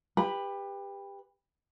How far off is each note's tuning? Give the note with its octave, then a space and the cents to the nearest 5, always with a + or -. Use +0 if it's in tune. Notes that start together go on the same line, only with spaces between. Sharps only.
G4 +25 B4 +0 B5 +0